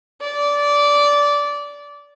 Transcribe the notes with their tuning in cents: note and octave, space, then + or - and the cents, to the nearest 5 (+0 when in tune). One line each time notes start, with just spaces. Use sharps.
D5 -15